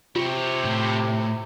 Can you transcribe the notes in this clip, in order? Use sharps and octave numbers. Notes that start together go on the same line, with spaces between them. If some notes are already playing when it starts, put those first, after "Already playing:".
C3 C4 F4 C#5
A2